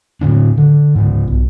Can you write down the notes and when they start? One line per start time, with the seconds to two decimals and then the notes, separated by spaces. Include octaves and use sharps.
0.21 A2 D3 D4
0.58 D3
0.95 G#2 C#3
1.28 B1